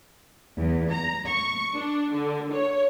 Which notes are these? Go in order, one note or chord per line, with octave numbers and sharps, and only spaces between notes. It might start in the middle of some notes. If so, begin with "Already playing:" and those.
E2
A#5
C#6
D4
D3
C#5